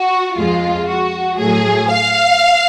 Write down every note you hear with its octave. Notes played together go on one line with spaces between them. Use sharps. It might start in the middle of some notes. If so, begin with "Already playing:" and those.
Already playing: F#4
F2 F3 G#3 F4
F#4
A2 F#3 A3 G#4
F5